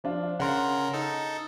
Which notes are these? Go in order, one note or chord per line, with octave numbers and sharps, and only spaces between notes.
F3 D4 F4
C#3 A#4 F#5 A#5 C6
D#4 A4